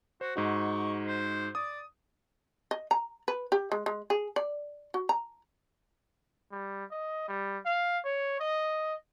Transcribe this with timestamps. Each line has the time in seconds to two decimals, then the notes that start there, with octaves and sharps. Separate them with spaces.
0.21 F#4 C5
0.36 G#2 D#4 F#4 C#6
1.07 C5
1.55 D5 D#6
2.71 D#5
2.91 A#5
3.28 B4
3.52 G4
3.72 G#3
3.86 G#3
4.10 G#4
4.36 D5
4.94 F#4
5.09 A#5
6.51 G3
6.91 D#5
7.28 G3
7.65 F5
8.04 C#5
8.40 D#5